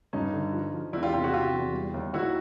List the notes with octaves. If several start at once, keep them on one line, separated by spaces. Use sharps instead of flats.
G2 C#4 D#4
D3
F3
F3
E2 D4 E4
F4 G4
C3 F4 G4
E4 F#4
C3 F4 G4
E2
G3
D#2
D#3 E4 F#4